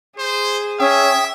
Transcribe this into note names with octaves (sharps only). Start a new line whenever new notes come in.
G#4 C5
C#4 E5 G5 D#6